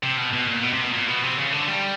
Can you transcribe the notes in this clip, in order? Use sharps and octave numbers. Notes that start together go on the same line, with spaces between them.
C3
B2
B2
A#2
B2
C3
B2
A#2
B2
C3
C#3
D3
G3